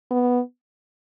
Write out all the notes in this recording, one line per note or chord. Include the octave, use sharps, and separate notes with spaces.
B3